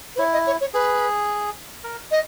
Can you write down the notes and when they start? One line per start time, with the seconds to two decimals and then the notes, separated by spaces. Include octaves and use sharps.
0.15 B4
0.18 E4 C#5
0.33 D#5
0.46 C#5
0.60 C#5
0.74 G#4 B4
1.84 A#4
2.11 D#5